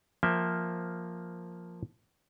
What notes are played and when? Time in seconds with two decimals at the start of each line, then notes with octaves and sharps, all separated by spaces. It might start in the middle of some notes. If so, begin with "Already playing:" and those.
0.23 F3 A#3 E5 G5